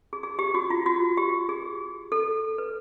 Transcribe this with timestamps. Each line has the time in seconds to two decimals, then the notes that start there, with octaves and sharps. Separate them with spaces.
0.13 G#4
0.23 G#4
0.39 G4
0.55 F#4
0.70 F4
0.86 F#4
1.17 G4
1.49 G#4
2.12 A4
2.58 B4